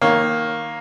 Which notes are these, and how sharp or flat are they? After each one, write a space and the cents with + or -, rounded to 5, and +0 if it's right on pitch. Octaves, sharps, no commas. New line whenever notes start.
D#3 +5 A#3 +5 C#5 +0